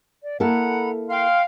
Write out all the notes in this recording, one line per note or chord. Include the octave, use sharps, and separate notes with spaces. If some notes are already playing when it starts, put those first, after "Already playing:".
D5
A#3 E4 A4 F#5 A#5 B5
F5 G5 C6 F6